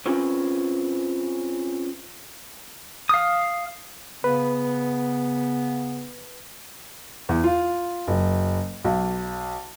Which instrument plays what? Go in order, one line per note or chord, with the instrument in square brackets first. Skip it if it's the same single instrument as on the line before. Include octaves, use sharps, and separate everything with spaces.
[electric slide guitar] C4 C#4 F4 G#4 A#4 B4
[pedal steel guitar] F5 D#6
[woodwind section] C#3 B3 [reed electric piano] B4
[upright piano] E2
F4
F#1
B1